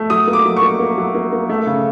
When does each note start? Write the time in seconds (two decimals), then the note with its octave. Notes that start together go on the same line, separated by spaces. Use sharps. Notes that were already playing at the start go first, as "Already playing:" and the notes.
Already playing: A3
0.10 F#3 D#6
0.27 A#3
0.33 D6
0.45 F#3
0.57 C#6
0.62 A#3
0.80 A#3
0.98 F#3
1.15 A#3
1.32 A#3
1.49 A3
1.67 C#3